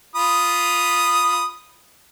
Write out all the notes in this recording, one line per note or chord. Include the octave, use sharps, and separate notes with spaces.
F4 B5 D#6